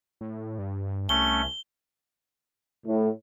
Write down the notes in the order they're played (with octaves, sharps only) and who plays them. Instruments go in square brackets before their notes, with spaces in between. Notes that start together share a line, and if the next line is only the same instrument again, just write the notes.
[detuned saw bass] A2
G2
[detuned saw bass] C2 [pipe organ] A3 C#4 [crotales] G7
[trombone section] A2